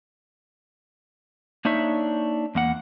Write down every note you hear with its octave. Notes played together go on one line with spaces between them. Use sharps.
A#3 D4 D#4 C#5 E5
E2 A#3 F#5